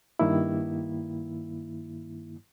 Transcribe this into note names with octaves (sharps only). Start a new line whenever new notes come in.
G2 D#3 A#3 E4